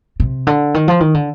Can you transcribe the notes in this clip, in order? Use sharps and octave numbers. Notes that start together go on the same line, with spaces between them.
C3
D3
D#3
F3
D#3
D3